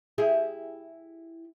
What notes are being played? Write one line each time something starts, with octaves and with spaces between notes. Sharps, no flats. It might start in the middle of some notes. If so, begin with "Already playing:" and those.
E4 G4 G#4